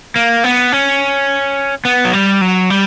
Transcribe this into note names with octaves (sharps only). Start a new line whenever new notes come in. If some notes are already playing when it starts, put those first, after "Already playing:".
A#3
B3
C#4
B3
F#3
G3
F#3
G3